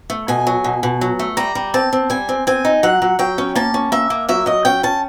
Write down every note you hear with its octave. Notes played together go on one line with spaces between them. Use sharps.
A3
B2 G#5
F#3
B2
B2
F#3
A3
G3 A#5
G3
C4 A5
C4
G3 G#5
C4
C4 G#5
D#4
F#3 F#5
F#3
F#3 G5
C#4
A#3 A5
C#4
A#3 E5
A#3
F#3 E5
F#3 D#5
C#4 G5
C#4 A5